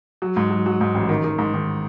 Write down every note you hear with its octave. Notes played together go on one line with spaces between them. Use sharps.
F#3
G#2
F#3
F#3
G#2
A1
D#3
D#3
G#2
D#3